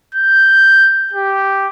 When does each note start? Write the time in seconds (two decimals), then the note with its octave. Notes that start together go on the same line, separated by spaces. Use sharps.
0.14 G6
1.13 G4